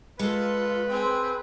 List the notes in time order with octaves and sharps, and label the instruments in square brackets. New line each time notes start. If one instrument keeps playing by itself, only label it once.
[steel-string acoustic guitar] G#3 [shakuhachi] F4 [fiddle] A4 [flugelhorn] B4
[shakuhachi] C4 [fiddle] G#4 G5